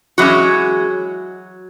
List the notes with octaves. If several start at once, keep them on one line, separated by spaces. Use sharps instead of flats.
E3 F#3 G#3 C#4 F#4